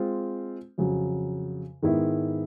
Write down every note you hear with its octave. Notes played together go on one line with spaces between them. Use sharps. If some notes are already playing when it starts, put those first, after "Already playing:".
Already playing: G#3 C4 F4
F2 C#3 F#3
G#2 D#3 G#3 B3 E4